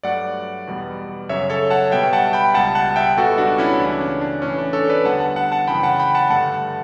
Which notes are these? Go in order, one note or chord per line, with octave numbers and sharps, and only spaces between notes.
G2 F#3 A3 D5 F#5
E2 B2 G3 B3
F#2 C#3 F#3 C#5 E5
A4 C#5
F#5 A5
B2 G3 B3 E5 G5
F#5 A5
G5 B5
C#2 B2 G3 F#5 A5
F#5 A5
E5 G5
C#2 B2 G3 B3 F#4 A4
D4 F#4
C#4 E4
C#2 C#3 E3 A3 D4
C#4
D4
A2 E3 A3 C#4
D4
A4 C#5
B4 D5
E2 D3 G3 B3 F#5 A5
F#5 A5
F#5 A5
F#5 A5
F#2 C#3 E3 G5 B5
F#5 A5
G5 B5
F#5 A5
G2 D3 A3 F#5 A5